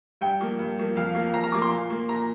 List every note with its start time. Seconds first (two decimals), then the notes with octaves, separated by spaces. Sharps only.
0.21 G2 G5
0.40 F3 A#3
0.59 G2
0.78 F3 A#3
0.96 F2 F5
1.15 F3 A#3 F5
1.33 F2 A#5
1.44 A#5
1.52 F3 A#3 D6
1.62 C6
1.71 A#2
1.90 A#3
2.08 A#2 A#5